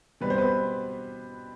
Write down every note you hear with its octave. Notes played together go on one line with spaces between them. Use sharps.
B2 G3 C4 B4
C5
B3 B4